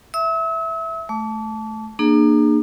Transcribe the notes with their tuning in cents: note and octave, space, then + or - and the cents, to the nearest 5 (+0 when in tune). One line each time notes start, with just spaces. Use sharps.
E5 +0 E6 -40
A3 -10 D6 -35
A#3 +0 D4 +40 G#4 +0